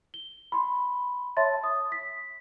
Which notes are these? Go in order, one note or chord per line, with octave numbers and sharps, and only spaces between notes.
G7
B5 C6
C#5 E5 A5 C6 A6
D#6
B6